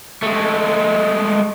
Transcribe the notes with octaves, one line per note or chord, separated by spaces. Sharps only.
G#3 A3